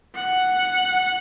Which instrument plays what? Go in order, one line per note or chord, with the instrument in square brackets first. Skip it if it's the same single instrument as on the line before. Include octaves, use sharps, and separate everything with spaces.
[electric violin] F#5